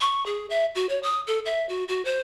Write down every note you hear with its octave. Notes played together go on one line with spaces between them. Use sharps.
C#6
G#4
E5
F#4
C#5
D#6
A4
E5
F#4
F#4
C5